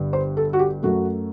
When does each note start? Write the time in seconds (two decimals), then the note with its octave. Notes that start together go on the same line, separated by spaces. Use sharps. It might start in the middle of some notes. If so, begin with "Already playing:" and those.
Already playing: G1 G2 D3
0.13 C5
0.37 A4
0.53 F#4
0.59 G4
0.82 F#2 F#3 A3 F#4